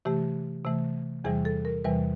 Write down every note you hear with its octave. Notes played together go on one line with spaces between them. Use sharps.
C3 E3 A3 G4
C3 E3 A3
E2 C3 E3 G3 G#4
A4
A#4
E2 C3 E3 G3 B4